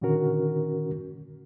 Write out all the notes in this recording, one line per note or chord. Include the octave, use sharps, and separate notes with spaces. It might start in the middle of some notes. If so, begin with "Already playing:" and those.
A#2 D3 D#3 C#4 F#4 A#4